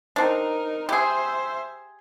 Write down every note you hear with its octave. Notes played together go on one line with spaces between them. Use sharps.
C4 D4 D#4 A#4
G4 G#4 C5 E5